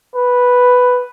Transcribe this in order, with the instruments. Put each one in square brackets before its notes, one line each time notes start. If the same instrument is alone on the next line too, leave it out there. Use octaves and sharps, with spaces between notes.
[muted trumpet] B4